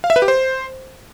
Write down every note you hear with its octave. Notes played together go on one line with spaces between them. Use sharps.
F5
E5
B4
G4
C5